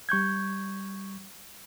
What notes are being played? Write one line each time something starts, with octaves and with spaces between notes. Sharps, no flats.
G3 C#6 G6 G#6